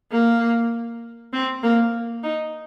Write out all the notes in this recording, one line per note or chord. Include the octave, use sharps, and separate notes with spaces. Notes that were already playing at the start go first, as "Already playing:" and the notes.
A#3
C4
A#3
D#4